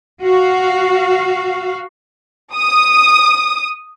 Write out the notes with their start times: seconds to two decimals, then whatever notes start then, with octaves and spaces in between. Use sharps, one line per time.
0.22 F#4 F5
2.56 D#6